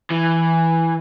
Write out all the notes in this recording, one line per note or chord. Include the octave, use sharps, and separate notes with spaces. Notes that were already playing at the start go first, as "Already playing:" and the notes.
E3